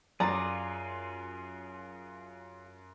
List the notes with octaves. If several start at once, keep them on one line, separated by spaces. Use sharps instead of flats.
F#2 F4 G#4 D5 A#5